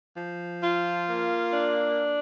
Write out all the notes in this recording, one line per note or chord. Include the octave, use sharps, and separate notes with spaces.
F3
F4
A#3
D4